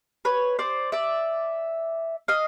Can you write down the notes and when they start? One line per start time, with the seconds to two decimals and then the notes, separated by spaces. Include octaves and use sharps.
0.25 B4 C#5
0.59 C5 D5
0.92 D5 E5
2.28 D#5 F5